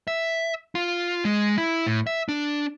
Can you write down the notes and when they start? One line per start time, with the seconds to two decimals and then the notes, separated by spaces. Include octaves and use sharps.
0.07 E5
0.75 F4
1.25 G#3
1.58 E4
1.86 A2
2.07 E5
2.29 D4